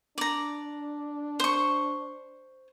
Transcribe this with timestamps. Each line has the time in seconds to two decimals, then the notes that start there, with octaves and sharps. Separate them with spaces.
0.18 D4 D5 A#5
1.40 C5 C#6